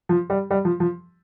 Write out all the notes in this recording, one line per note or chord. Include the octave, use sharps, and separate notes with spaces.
F3
G3
G3
F3
F3